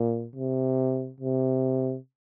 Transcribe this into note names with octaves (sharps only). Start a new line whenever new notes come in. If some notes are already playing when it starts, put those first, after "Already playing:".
Already playing: A#2
C3
C3